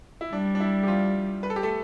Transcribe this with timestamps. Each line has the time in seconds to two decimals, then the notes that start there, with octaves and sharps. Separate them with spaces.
0.21 E4
0.32 G3 D4
0.55 D4
0.60 E4
0.83 G4
0.87 F3 F4
1.43 B4
1.50 A4
1.56 G4
1.63 A3 A4